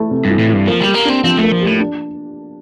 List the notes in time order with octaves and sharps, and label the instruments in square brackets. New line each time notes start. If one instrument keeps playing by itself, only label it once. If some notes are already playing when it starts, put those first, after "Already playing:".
Already playing: [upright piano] E3 A3 E4
C3
[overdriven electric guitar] G2
[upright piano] E3
[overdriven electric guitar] A2
[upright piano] E4
[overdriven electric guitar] G2
[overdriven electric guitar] F3 [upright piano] A#3
[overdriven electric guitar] G3 [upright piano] G4
[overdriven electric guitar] A#3
[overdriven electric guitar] C4 [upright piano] D4
[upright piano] F3 [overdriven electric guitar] C4
[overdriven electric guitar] A3
[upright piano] A#3
[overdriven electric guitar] F3
[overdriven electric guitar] A2 [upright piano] G4
[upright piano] D4